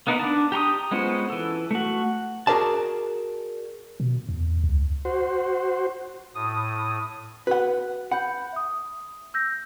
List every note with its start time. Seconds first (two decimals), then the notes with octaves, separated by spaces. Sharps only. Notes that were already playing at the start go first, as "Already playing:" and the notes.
0.07 A#3 B3 D#4 A#4 B4
0.20 D4 A5
0.52 G4 A#5 C6 D#6
0.91 G#3 B3 C#4 F4 C5
1.30 E3 A4
1.71 A3 F#4
2.47 F#4 G#4 A#4 D5 A5
4.00 B2
4.29 E2
4.64 C#2
5.05 F#4 C5
6.35 A2 D#6
7.47 F#4 B4 F#5
8.11 F#5 B5 G6
8.53 E5 D#6
9.34 E6 G6 A#6